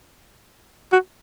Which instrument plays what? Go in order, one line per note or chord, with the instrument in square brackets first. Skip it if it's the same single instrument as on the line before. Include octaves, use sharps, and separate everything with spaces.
[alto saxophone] F#4